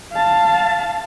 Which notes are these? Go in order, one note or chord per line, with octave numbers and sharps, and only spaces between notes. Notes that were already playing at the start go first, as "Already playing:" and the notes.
F5 A5